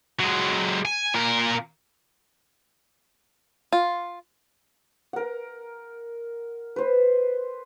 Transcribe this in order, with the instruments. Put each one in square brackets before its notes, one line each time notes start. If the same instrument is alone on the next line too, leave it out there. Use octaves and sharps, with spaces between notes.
[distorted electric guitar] F#3 G#3
G#5
A#2 A#4
[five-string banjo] F4
[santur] A#4 F#5
B4 C5